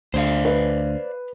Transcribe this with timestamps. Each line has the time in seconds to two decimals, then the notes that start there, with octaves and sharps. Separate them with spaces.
0.14 D2 D3 C5 D5 F5
0.45 B4